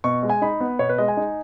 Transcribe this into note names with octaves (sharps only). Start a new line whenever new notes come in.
B2 C#6
G#3
G#5
D#4 B5
B3
B2 C#5
B4
G#3 D#5
G#5
D#4